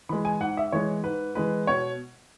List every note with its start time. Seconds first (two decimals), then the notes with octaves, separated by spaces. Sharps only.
0.09 E3 G#3 B5
0.25 G#5
0.41 G#2 F#5
0.57 E5
0.72 E3 G#3 C#5
1.04 G#2 B4
1.35 E3 G#3 B4
1.67 B2 C#5